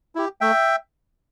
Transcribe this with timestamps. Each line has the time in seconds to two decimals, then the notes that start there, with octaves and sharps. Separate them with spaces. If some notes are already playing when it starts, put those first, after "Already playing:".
0.15 E4 G4
0.41 A3 E5 G5